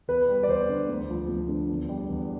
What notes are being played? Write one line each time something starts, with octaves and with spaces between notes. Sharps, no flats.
E2 B4
G3
D5
E2 C5
D3
D2
F3
D2
D3
E2
G3
E2